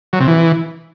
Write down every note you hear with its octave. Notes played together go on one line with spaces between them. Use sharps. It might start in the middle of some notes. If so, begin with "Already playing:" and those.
F#3
C3
E3